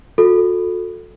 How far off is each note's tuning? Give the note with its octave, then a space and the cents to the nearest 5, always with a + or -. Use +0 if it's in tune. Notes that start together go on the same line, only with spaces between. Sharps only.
F#4 -40 A4 +0